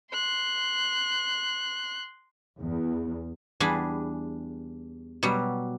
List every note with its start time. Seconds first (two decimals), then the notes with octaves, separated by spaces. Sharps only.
0.13 C6 F#6
2.60 E2
3.60 E2 G3 D4 G#4 B5
5.23 B2 F#3 G3